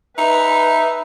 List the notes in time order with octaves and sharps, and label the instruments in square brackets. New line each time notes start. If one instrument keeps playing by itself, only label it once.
[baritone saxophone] D#4 [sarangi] B4 [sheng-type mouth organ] E5